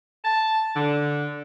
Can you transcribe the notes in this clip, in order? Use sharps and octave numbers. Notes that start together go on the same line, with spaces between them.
A5
D3